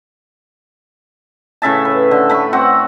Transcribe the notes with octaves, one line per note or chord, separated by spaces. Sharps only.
A2 C#3 E5 A5
B4
D3
A3 B5 C#6
C4 F#4 F#5